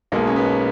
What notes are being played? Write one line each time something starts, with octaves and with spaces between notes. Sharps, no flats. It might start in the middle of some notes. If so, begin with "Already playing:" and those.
B1 B2 G#3 A#3
C#4
B3